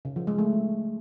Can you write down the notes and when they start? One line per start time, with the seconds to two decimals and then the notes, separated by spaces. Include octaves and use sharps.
0.05 C#3
0.16 F3
0.27 G#3
0.38 A3